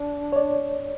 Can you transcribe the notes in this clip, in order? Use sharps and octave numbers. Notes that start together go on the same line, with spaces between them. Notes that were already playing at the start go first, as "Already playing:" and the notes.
Already playing: D4
C#5
D5